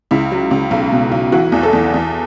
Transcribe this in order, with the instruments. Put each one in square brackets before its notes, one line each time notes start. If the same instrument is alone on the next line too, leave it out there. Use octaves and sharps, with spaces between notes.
[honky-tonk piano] C#2 E4
F#3
C#2
B1
B2
B1
E3 F#4
E2
A4
E2
E2